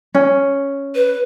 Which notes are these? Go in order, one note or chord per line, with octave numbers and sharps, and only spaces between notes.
C#4
B4